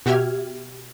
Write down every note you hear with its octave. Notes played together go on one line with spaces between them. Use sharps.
B2 F#4 G4 E5 F6 G#6